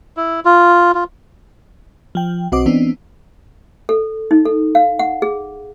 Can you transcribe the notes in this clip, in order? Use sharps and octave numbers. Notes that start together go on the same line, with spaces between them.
E4
F4
F4
F3 G5
B1 C4 F#4 D#5 D6
E3 B3 C4 D4 D#4
A4
D#4
A4
F5
F#5
G#4